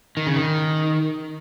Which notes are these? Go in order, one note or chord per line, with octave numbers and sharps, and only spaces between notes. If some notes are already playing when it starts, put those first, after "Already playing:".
D#3
C#3
D#3